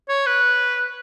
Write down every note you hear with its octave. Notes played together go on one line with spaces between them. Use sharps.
C#5
B4